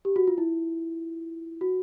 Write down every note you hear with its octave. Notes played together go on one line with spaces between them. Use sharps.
G4
F#4
F4
E4
F#4